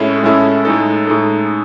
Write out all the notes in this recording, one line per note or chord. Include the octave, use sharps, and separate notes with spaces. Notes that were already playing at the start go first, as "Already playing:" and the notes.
Already playing: A2 G#3 C#4 E4 A4
A2 G#3 C#4 E4 A4
A2 G#3 D#4 A4
A2 G#3 D#4 A4